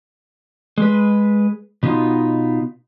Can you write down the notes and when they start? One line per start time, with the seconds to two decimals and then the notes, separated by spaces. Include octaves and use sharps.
0.78 G#3 B4
1.83 B2 B3 D#4 F4